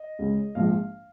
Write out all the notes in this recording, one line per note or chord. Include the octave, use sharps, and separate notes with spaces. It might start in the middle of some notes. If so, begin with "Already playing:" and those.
Already playing: D#5
C#2 C#3 G#3
A#1 G#2 F3 G#3 F5